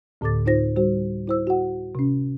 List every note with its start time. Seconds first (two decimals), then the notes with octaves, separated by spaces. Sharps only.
0.21 D2 A2 D3 A4 D6 A6
0.46 A2 D#4 F4 C5 A#6
0.76 G3 F#4 C5
1.27 E4 C5 E6
1.47 F#4 F#5
1.95 C3 C#4